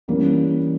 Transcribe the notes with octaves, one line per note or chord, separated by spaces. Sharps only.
E3 G3 A#3 C#4